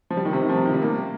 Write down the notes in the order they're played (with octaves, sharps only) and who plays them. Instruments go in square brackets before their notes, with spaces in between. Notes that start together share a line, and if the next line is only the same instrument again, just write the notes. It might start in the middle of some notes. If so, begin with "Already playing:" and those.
[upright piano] F3
G3
D#3
C3
D#3
F3
C3
D#3
G3
A#3